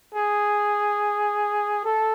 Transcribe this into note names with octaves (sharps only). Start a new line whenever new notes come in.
G#4
A4